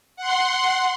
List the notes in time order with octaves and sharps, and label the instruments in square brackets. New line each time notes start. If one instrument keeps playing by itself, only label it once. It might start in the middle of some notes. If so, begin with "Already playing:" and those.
[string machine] F#5 C6